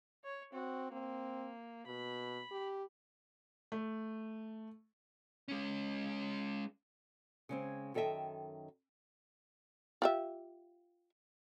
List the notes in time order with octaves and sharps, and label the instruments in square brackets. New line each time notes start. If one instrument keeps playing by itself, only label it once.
[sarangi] C#5
[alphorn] C4 [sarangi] F#4
[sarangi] A#3 [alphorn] C4
[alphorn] B2 [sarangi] B5
[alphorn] G4
[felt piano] A3
[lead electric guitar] G#3 C#4
[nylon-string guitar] C#3 G#3 C4
F#2 D#3 A4 D#5 E5 G5
[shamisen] F4 G4 E5